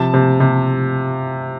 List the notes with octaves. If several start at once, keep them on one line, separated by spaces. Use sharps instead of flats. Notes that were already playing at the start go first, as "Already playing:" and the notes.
Already playing: C3 F3 A5
C3
C3